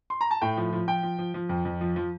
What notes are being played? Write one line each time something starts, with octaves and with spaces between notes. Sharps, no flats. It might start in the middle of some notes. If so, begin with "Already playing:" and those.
C6
A#5
A5
A2 G5
F3
F3
F3 G5
F3
F3
F3
F2
F2
F3
F3